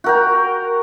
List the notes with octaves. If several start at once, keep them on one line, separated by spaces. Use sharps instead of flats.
F#4 A#4 G5